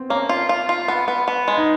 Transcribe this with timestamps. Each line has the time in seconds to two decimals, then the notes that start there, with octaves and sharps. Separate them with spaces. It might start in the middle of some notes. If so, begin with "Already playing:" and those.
Already playing: B3 C4
0.10 A#3 C#4
0.29 F4
0.49 F4
0.69 F4
0.88 B3
1.08 B3
1.28 B3
1.48 G#3
1.57 D#4